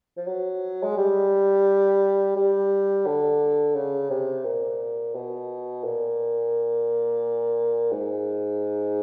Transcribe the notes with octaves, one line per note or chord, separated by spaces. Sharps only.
F3
F#3
G#3
G3
G3
D3
C#3
C3
A#2
B2
A#2
G#2